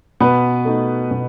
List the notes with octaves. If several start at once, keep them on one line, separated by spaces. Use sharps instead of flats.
B2 B3 B4
A3 D#4
B2